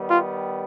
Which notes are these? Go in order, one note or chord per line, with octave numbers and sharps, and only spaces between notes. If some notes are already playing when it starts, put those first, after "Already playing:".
Already playing: D#3 G3 B3
F4